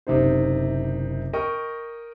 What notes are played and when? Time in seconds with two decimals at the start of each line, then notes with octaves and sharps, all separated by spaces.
0.07 F#1 C3 D#4 C5
1.33 A#4 D#5 G5 C#6